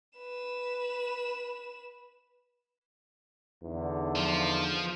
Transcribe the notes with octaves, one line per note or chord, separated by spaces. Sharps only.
B4 E7
E2 D3 D#4
F3